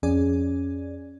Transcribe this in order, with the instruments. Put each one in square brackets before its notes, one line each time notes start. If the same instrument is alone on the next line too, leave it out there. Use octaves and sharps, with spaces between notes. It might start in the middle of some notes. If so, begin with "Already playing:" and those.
[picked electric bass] F2 [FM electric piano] C#4 G#4 D5